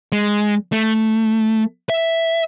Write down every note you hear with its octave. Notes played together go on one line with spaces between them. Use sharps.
G#3
A3
E5